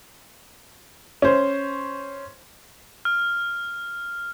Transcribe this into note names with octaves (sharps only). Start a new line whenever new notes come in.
C#4 C5
F6